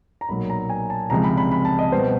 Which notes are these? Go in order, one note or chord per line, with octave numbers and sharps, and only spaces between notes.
A#5
B1 A#2 F#3 A#3 B5
A#5
G#5
A5
C#2 C3 F3 G#3 A#5
B5
B5
B5
A5
D#5
B2 G3 B3 C5